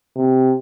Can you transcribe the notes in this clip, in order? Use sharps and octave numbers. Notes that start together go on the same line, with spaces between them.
C3